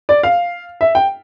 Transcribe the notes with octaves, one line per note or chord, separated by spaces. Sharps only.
D5
F5
E5
G5